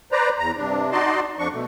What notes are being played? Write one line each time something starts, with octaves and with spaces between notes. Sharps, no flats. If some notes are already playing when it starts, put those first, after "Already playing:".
B4 C5 D5 A#5
E2 A#5
G2 C3 D4
D#4 F#4 D5 D#5 A5 C6
F2 F3 D4 C#6
B2 A3